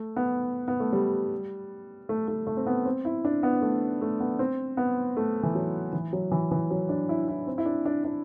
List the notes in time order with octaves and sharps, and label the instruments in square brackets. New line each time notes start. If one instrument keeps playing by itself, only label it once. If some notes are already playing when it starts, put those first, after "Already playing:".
Already playing: [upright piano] A3
B3
B3
A3
G3
A3
A3
A3
C4
B3
C4
E4
D4
B3
A3
A3
B3
C4
B3
A3
E3
F#3
E3
F#3
E3
E3
F#3
D4
E4
E4
C4
E4
D4
D4
D4